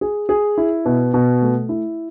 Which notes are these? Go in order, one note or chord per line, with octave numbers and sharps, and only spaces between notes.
G#4
G#4
E4
B2
B2
A3
E4